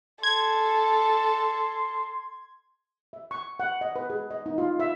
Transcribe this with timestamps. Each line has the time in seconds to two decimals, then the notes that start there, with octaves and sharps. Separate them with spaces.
0.23 A4 C6 G#6
3.13 E5
3.31 C#6
3.60 F#5
3.81 D#5
3.96 B4
4.10 G#4
4.31 D#5
4.46 D#4
4.58 F4
4.80 E5